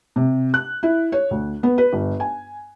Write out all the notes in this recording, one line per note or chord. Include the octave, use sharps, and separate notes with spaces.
C3
F#6
E4
C#5
D2
B3
B4
G1
G#5